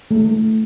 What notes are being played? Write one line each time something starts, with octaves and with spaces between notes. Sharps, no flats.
A3